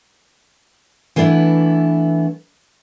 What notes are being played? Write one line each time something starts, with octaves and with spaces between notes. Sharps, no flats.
E3 A3 B3 D4 E4